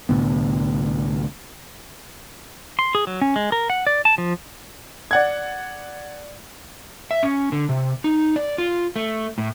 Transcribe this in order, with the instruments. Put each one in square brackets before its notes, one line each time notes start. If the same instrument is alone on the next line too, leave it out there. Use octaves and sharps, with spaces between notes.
[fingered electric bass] C2 A2 D3 B3
[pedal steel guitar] C6
G#4
F#3
C#4
G#3
A#4
F#5
D5
A5
F3
[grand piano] D5 F#5 G#6
[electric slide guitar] E5
C#4
D3
C3
D#4
D5
F4
A3
A2